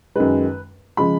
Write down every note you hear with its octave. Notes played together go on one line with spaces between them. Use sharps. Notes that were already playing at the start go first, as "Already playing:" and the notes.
F#2 D#3 G#3 B4
C#3 F3 G#3 B5